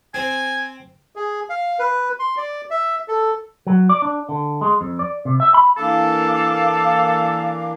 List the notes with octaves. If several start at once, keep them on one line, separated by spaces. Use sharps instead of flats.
C4 G#5
G#4
F5
B4
C6
D5
E5
A4
F#3
D5
D4
D3
G#3
F2
D5
C3
E5
B5
E3 A#3 D4 A4 F5 D6